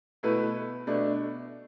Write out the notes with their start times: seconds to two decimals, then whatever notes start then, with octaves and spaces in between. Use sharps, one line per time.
0.23 B2 A3 E4 B4
0.87 B2 A3 D4